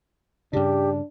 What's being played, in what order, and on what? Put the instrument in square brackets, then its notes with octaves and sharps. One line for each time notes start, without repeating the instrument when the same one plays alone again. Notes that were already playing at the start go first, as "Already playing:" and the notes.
[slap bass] G2 C#3 [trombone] D4 [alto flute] G4